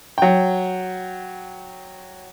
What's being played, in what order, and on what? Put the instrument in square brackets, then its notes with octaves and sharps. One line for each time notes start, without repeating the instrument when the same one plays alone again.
[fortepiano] F#3 G5